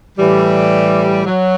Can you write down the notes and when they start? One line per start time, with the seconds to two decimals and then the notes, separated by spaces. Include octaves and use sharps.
0.18 A2 E3 G3
1.25 F#3